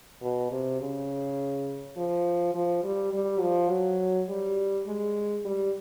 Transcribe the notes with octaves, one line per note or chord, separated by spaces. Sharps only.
B2
C3
C#3
F3
F3
G3
G3
F3
F#3
G3
G#3
G3